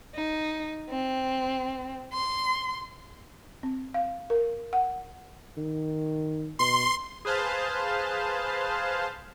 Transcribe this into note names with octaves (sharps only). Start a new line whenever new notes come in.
D#4
C4
C6
C4
F5
A#4
F#5
D#3
B2 C6
G#4 B4 C5 F5 A5